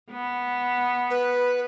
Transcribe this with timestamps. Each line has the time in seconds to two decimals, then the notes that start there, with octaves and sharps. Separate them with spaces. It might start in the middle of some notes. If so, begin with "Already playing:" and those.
0.10 B3
1.10 B4